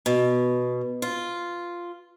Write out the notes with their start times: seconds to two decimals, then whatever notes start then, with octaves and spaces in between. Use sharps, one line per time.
0.06 B2
1.02 F4